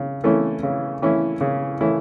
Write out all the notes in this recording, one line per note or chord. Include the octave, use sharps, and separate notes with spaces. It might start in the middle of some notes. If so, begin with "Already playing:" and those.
Already playing: C#3
E3 A3 C#4 E4
C#3
E3 A3 C#4 E4
C#3
E3 A3 C#4 E4